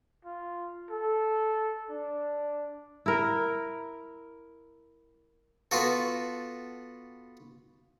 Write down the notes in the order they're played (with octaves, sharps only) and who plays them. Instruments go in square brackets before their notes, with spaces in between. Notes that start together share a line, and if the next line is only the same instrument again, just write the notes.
[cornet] F4
A4
D4
[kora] E4 A#4
[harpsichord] B3 F4 F#4 A4